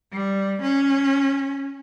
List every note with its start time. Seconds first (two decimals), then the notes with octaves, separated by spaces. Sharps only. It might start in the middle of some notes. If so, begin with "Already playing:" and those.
0.12 G3
0.62 C#4